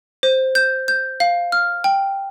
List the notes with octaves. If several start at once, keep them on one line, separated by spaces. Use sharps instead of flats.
C5
G6
G6
F5
F6
G5